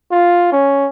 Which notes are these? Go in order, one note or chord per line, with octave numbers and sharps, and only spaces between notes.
F4
C#4